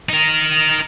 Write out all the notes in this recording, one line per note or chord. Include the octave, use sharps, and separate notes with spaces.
D#4 A#4